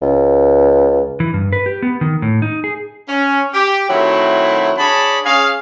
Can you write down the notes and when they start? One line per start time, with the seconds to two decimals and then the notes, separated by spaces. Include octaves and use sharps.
0.02 C#2
1.20 E3
1.34 G2
1.53 B4
1.66 G4
1.82 B3
2.01 D#3
2.22 A2
2.42 D#4
2.64 G#4
3.08 C#4
3.54 G4
3.90 D#3 F#3 A3 C4 E4
4.78 D4 G#4 C#5 A5 B5
5.25 C#4 G#4 F5